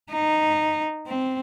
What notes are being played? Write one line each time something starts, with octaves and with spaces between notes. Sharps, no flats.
D#4
C4